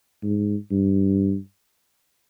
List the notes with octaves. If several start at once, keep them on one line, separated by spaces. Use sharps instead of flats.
G#2
G2